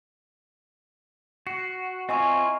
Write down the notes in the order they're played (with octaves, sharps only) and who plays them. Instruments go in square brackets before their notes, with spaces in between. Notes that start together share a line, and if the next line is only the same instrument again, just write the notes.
[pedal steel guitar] F#4 [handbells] C7
[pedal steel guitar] C4 E4 F4 [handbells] D#5 G#5 C#6